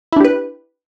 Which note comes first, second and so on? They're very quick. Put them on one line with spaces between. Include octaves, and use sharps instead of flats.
E4 D4 G4 B4